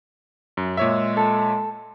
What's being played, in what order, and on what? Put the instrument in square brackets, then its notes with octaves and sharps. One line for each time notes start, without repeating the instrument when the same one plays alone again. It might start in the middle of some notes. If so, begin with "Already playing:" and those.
[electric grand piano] F#2
[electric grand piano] A#2 C#5 E5 [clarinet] G#3
[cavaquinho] A4